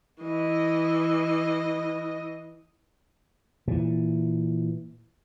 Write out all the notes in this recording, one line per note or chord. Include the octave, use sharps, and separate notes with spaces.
E3 D#5
A#2 E3